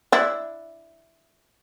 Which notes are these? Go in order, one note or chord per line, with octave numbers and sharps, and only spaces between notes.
D4 E4